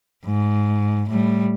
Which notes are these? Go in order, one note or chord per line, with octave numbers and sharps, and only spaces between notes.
G#2
A2 G3